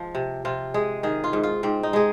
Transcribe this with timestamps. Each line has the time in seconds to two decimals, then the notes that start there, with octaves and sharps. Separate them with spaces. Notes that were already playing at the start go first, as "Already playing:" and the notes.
Already playing: F3 G#3
0.15 C3
0.45 C3 F4
0.74 G#3 G#4
1.03 D#3 G#4
1.24 F4
1.33 G#2
1.43 F4
1.63 G#2 C4
1.83 D#4
1.93 G#3 G#4